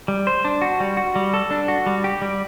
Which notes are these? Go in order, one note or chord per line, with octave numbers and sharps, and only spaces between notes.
G3
C5
D4
F#4
G3
F#4
G3
A4
D4
F#4
G3
G4
G3